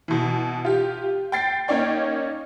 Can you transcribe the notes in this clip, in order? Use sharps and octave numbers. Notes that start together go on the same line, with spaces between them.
B2 E3
F4 G4
G5 A6 C7
A#3 C#4 D#4 C#5 D5 G5